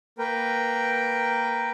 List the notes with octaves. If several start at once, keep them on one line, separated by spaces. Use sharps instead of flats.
A#3 A#4 B4 G5